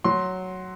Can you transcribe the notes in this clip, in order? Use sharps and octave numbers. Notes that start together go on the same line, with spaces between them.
F#3 C6